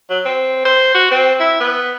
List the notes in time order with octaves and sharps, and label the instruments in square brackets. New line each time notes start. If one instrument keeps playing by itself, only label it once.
[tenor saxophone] F#3
C4
C5
F#4
C4
E4
B3